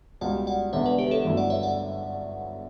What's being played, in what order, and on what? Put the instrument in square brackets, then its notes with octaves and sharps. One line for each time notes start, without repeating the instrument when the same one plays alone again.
[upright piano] C#2 B2 G3 [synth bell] D5 F#5
[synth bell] D5 F#5
[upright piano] E1 E2 D3 [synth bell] C#5 E5
[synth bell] B4 D5
G4 B4
A4 C#5
[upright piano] G1 F#2 D3 A3 E4
[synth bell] D5 F#5
C#5 E5
D5 F#5